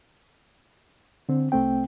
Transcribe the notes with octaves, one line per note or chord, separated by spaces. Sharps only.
D3 C4
C2 A3 C4 G5